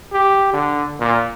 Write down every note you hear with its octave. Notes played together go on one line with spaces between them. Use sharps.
G4
D3
A#2